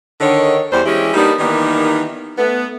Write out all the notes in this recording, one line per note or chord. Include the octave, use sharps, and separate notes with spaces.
D3 D#3 C#5
E2 G3 C5
E3 G#3 C#4 E4 G4
G3 A#3 B3 D4 D#4
D#3 E3 G3 A#3 B3 D#4
A3 B3